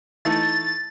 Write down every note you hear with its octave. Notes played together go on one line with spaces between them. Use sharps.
E3 A3 D#4 A6